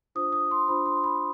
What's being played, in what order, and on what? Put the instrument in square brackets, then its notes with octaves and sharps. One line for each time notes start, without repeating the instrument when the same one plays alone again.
[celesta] D4 F4 C5 D#6
D#6
C6
D4 F4 C5 B5
C6
C6
B5